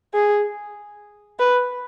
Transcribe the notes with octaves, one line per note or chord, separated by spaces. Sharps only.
G#4
B4